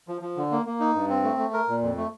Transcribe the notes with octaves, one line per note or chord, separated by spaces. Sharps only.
F3
F3
D3
A#3
A#3
D#4
G2
C4
A3
A3
A#4
A#2
F2
A3